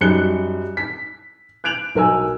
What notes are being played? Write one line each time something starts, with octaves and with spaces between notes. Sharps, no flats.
F#2 G3 D#4 F#6 C#7 G7
B6
F#6 G6 D7 F7 F#7
B1 A#4 G#5 E6